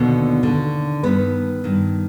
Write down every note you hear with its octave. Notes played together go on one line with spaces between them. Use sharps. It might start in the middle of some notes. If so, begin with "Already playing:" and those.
Already playing: D#2 B2 D3 B3
D#2 D3
G2 D#3 B3 B4
G2 D#3